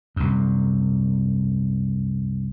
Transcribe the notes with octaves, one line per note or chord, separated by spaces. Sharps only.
C2 F#2